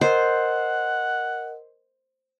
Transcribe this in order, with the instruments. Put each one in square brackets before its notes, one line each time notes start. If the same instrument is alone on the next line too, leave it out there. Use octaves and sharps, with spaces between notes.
[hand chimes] A#4 D#5 [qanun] C5 [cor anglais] F#5